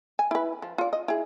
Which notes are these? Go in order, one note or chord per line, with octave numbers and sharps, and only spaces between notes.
G#5
E4 B4
F3
F4 D5
D#5
E4 G#4